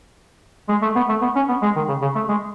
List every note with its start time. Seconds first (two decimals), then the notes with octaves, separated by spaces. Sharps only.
0.69 G#3
0.82 A3
0.96 B3
1.09 A3
1.22 B3
1.35 C#4
1.49 B3
1.62 G#3
1.76 D#3
1.88 C#3
2.02 C#3
2.15 A3
2.29 G#3